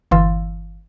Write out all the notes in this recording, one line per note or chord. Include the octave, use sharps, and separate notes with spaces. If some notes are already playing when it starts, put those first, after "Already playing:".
G1 E3 F5 C6 E6 A6